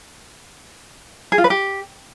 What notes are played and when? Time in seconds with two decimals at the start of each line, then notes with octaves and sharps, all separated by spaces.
1.32 G#4
1.38 F4
1.44 B4
1.50 G4